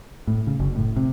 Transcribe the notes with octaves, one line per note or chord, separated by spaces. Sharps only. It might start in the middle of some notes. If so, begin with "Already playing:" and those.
A2
C#3
F#1
A2
C3